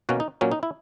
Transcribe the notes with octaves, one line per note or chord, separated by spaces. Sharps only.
B2 A#3 C#4 F#4
D#4
A#2 F#3 A#3 C#4
D#4
E4